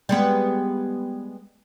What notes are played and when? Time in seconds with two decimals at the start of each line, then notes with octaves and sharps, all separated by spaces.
0.09 G3 G#3 B3